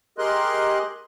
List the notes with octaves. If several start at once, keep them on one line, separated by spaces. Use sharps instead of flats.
G4 G#4 A#4 D#5 C6 F#6